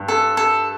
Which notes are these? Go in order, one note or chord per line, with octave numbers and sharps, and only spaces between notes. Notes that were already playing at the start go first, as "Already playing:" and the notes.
Already playing: G2
A4
A4